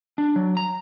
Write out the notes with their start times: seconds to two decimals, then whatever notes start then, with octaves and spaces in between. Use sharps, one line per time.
0.18 D4
0.36 F#3
0.57 A#5